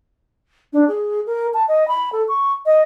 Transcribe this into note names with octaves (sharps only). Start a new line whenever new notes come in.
D4
G#4
A#4
A5
D#5
B5
A4
C#6
D#5